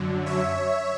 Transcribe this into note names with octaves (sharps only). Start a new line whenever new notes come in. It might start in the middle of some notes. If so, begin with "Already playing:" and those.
Already playing: F#2 D3 F#3
C#5 E5